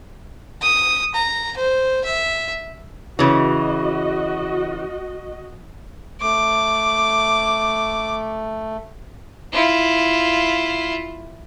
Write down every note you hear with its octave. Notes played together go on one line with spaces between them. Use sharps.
D#6
A#5
C5
E5
C#3 E3 F#4 D#5
A3 D6
E4 F4